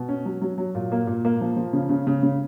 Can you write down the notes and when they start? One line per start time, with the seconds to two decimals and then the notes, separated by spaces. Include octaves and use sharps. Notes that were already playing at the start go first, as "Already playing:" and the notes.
Already playing: B2
0.09 C#4
0.25 F#3
0.42 F#3
0.58 F#3
0.75 A#2
0.92 A#3
1.07 A#2
1.25 A#3
1.41 F3
1.56 F3
1.73 C#3
1.89 C#3
2.07 C#3
2.23 C#3